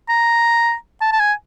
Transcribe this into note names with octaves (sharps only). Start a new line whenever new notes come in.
A#5
A5
A5
G#5